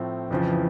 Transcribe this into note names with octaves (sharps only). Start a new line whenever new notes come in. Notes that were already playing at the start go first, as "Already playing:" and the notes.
Already playing: A2 F3 A3 C4
F2 C#3 E3 F3